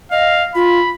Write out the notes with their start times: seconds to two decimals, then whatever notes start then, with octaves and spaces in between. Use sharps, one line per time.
0.11 D#5 F5
0.55 F4 B5